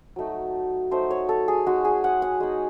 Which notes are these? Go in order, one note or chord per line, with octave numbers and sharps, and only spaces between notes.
F#3 A3 D#4
F#3 A3 D#4 C5
C#5
A4
G#4
G#3 D#4 F#4
G#4
F#5
F#5
G#3 D#4